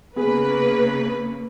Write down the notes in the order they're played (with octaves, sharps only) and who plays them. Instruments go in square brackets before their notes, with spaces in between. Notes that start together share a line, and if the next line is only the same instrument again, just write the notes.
[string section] C#3 A#3 [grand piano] B3 G#4 [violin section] B4